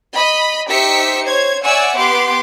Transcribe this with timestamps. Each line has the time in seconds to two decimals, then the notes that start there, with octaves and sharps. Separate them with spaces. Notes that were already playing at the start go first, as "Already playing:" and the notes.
0.14 D#5 B5
0.70 D#4 G4 C5 E5 B6 C#7
1.25 C5 C#5 G#6
1.64 C#5 D5 E5 F#5 G#5 E6
1.97 B3 G4 C6 D6